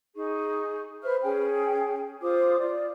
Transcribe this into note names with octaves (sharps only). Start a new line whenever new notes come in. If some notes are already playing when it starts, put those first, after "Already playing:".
D#4 G#4 C#6
B4 C5 E5 F6
C#4 G#4 G5
F4 C5 D6 D#6
F4 D5